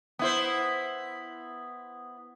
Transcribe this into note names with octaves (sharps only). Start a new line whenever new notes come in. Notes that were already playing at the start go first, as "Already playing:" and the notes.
B3 E4 C5